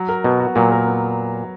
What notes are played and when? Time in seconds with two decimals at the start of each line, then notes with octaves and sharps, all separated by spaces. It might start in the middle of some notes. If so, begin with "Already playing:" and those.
Already playing: F#3
0.09 A#4
0.24 B2 B3
0.40 F#4
0.55 A#2 F#3
0.72 A#4
0.88 B3